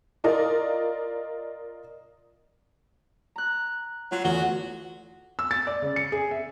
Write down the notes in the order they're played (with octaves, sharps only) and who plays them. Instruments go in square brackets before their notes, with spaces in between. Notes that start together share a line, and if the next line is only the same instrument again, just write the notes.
[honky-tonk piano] F4 A#4 D5 D#5
[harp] A#5 F#6
[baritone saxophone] F#3 [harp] F4
[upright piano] E2 A3 G7 [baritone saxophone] F#4
[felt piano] E6
A6
D5
C#3
C#7
G#4
E5